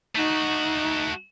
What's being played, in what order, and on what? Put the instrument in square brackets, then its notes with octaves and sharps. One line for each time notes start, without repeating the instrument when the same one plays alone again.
[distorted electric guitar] A3 F#4 [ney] D#4